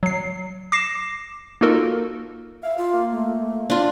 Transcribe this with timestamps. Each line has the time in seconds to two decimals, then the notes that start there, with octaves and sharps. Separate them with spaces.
0.03 F#3 C7
0.72 D6 A#6 C7 E7
1.61 A#3 D#4 F4 F#4 A4 A#4
2.63 E5 F5
2.78 F4
2.93 A#3
3.11 A3
3.70 D4 F4